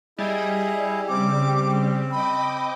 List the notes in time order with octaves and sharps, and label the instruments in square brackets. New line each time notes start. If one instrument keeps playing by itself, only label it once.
[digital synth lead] G3 [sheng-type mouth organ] E4 G#4 [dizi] D#5
[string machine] C#3 [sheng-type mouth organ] C4 [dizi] D6
[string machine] D#5 G5 D6 [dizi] B5